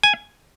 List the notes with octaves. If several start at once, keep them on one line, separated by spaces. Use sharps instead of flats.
G#5